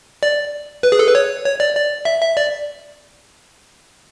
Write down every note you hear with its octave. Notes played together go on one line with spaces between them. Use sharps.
D5
B4
G#4
A4
B4
C#5
C#5
D5
D5
E5
E5
D5